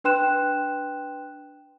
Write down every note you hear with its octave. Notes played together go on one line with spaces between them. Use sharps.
D4 B4 G5 C6 F#6 E7